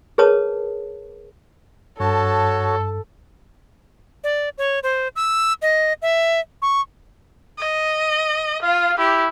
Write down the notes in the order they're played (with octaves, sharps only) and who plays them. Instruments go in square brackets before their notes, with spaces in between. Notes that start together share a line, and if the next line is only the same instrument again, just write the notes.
[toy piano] G#4 A#4 B4 C#5 A5 D#6
[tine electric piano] G2 [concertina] F#4 C#5 [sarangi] A4 [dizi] A5
[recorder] D5
C#5
C5
E6
D#5
E5
C#6
[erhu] D#5
[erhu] F4 [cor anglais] F5
[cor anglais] E4 [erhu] G4